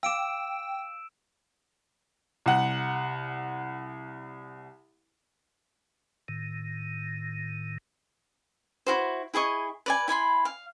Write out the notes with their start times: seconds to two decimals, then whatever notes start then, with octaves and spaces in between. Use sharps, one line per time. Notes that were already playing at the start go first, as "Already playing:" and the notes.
0.03 F5 G5 D6 E6 D7 E7
2.46 C2 F#5
6.28 A2 D#3
8.86 E4 F#4 C5
9.34 E4 G#4 D#5 C#6
9.86 B4 D5 G#5
10.08 E4 G#5 B5 C6
10.45 F5